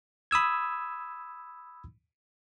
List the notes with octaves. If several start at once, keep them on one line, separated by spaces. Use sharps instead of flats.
B5 D#6 E6 G#6